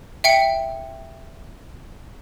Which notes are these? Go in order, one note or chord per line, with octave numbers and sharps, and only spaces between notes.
E5 G5 C#7